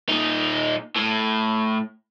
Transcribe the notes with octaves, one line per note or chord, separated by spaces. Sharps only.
A#2 D#4
A2